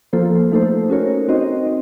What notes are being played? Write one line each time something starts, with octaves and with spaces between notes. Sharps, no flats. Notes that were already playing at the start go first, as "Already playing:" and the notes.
F3 A#3 F4 A4 C5
A3 D#4 A4 C5
C#4 F#4 A#4 C#5
C4 D#4 F#4 C5 D#5
C4